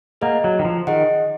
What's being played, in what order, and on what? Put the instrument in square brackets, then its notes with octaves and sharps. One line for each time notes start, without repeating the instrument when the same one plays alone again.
[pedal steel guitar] A#3 [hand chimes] G#4 D#5 F#5
[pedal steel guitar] F#3
D#3
F3
[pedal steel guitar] D#3 [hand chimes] G#4 D#5 F#5